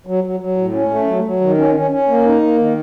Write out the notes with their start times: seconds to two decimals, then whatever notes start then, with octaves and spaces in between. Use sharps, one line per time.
0.06 F#3
0.24 F#3
0.40 F#3
0.57 A2
0.74 C#4
0.90 A3
1.07 F#3
1.24 F#3
1.41 D#3
1.58 C#4
1.75 C#4
1.91 C#4
2.08 A#3
2.25 D#4
2.42 A#3
2.59 D#3